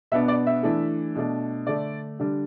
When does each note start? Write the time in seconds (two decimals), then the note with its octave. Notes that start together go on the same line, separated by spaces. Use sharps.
0.12 B2 B3 D4 E5
0.28 D5
0.47 E5
0.63 E3 A3 D4
1.15 B2 A3 D4
1.67 D3 A3 D4 D5
2.20 D3 G3 D4